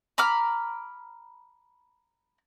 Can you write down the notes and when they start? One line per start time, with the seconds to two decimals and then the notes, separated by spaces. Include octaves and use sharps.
0.18 A#5 B5 D6 F6